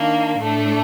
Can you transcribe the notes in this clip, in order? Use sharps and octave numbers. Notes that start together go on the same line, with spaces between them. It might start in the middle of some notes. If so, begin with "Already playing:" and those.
Already playing: D#3 A#3 D4
A2 A3 D4